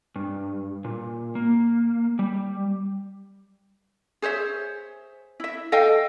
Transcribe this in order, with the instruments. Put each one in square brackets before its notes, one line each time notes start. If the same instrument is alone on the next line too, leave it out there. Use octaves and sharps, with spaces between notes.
[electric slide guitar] G2
A#2
A#3
G3
[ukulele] G#4 C5 C#5 E5
E4 E5
A4 D#5 F5 G5